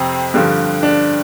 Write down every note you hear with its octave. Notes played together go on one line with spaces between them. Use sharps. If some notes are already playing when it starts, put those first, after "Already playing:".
Already playing: F2 C3 C4
G2 D3 F3
D4